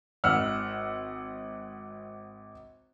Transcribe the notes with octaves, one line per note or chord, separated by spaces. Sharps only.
G#1 F#5 E6 F6